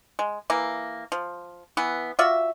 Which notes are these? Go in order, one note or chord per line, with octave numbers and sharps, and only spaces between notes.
G#3
E3 A#3
F3
E3 B3
F4 F#4 D5 E5